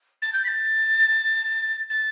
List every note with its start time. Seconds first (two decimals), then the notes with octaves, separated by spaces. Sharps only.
0.22 A6
0.33 G6
0.44 B6
0.48 A6
1.90 A6